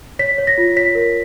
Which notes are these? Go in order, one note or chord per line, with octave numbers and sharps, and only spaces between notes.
C#5 B6
C#5
A#6
F4
C#5 B6
A#4